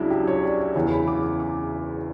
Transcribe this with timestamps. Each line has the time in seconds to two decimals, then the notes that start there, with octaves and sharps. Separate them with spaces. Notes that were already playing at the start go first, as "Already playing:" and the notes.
Already playing: C#2 C#3 F#3 D4 E4
0.10 G4
0.27 C#5
0.43 D5
0.58 C#5
0.75 F#1 E2 C#3 E3 C#5
0.91 B5
1.08 D6
1.40 D6